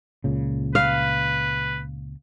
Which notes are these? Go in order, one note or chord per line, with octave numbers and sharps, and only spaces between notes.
C#2 A#2 C#3
B4 F5